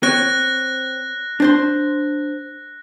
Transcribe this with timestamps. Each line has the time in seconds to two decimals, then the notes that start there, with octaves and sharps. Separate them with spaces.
0.03 C4 C#5 F#6 A#6
1.40 D4 C5 C6